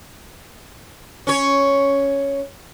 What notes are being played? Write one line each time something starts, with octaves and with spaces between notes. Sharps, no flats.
C#4 C#5